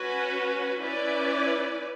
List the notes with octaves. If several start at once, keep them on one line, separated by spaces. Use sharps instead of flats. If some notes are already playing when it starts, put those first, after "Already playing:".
Already playing: C#4 F#4 B4
C#4 E4 B4 D5